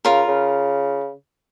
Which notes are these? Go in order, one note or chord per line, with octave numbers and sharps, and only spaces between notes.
C#3 F4 A#4
C#3